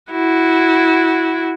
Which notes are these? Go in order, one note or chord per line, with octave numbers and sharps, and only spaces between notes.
E4 F#4